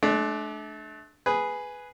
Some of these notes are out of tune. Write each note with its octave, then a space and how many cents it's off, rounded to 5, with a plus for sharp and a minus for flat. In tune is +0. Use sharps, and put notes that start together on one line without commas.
A3 -40 D4 +10
G#4 +0 B4 +0